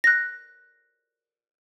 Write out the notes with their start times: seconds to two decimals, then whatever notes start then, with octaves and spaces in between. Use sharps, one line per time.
0.04 F#6 A#6